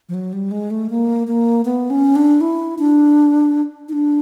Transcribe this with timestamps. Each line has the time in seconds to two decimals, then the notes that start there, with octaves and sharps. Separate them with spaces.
0.09 F3
0.14 F#3
0.33 G3
0.51 G#3
0.70 A3
0.90 A#3
1.27 A#3
1.65 B3
1.90 C#4
2.16 D4
2.41 E4
2.79 D4
3.89 D#4
3.92 D4